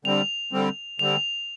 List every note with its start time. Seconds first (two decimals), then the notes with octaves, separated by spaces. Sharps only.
0.05 D3 G3 C4 F7
0.52 D3 G3 C4
0.99 D3 G3 C4 F7